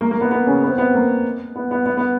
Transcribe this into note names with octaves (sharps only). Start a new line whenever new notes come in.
A#3
A#3
B3
B3
C#3 C#4
B3
C4
B3
A#3
B3
B3
B3
B3